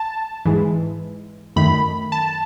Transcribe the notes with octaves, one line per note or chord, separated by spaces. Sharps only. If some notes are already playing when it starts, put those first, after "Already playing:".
Already playing: A5
G#2 E3 G#3
F#2 D#3 A3 B5
A5